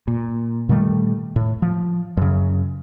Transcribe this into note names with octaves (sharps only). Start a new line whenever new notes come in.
A#2
A#2 D#3 G3 A3
A2
F3
F#2 C#3